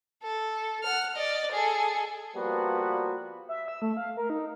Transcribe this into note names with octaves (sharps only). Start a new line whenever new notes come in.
A4
F#5 F6
D5 D#5
G#4 A4
F3 G3 A#3 B3 F#4 B4
E5
E6
A3
F5
A#4
D#4